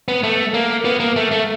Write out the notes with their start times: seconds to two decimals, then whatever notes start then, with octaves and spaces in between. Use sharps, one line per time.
0.08 B3
0.23 A3
0.54 A#3
0.85 B3
1.00 A#3
1.16 A3
1.31 A3